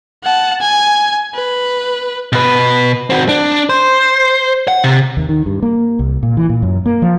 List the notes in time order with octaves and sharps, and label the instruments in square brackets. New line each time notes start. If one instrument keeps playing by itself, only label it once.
[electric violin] F#5 A5
G#5
B4
[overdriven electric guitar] B2 B4
C4 F#4
D4
C5
F#5
C3
[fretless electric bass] D#2
D#3
G2
A#3
C2
A#2
E3
A#2
F#2
A#3
F3